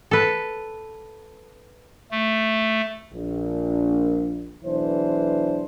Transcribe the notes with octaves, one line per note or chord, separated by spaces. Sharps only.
A4 B4
A3
A#1
B1 E3 D4 C5